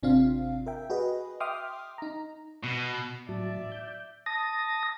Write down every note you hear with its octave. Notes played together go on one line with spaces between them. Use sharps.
G#1 C3 C4 D4 F4 F5
A#4 E5 G5
F#4 G#4 B4 D#5
E5 G5 C6 D6 D#6 F6
D#4 A#5
B2
A2 F#3 D5 E5 A5
G6
A5 D#6 A#6